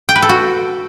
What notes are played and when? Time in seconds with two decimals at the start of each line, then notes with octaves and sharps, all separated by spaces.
0.09 G5
0.16 B4
0.22 A4
0.29 F#4